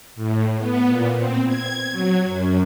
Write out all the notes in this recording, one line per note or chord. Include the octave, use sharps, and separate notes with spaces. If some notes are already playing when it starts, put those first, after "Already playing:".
A2
B3
A#2
C4
G#6
F#3
F#2